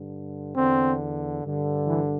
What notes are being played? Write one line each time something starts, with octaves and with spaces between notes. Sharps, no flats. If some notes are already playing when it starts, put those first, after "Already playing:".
Already playing: G2 D3
E2 D3 C4
G2 D3
E3